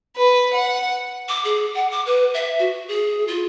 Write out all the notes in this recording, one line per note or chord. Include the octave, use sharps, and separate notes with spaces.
B4
F#5
D6
G#4
F#5
D6
B4
E5
F#4
G#4
F4